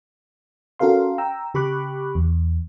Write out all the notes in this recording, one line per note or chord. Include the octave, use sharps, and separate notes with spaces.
C#4 F#4 A4 A#4 F5 C6
G5 A#5 E6
C#3 G4 B5 C#6 D6 F#6
E2